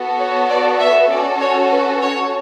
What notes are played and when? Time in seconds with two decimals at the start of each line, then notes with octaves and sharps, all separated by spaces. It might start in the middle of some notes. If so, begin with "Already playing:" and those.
Already playing: B3 F#4 A4
0.19 C#5
0.49 D5
0.79 E5
1.10 C#4 F#4 A4 D5
1.41 C#5
1.71 B4
2.02 C#5